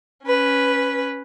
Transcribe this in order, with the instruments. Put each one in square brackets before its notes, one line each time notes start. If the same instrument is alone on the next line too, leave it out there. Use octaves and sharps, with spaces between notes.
[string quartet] C#4 B4